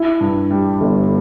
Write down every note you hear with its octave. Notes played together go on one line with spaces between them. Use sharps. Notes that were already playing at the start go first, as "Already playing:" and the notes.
Already playing: E4
G2
G3
G1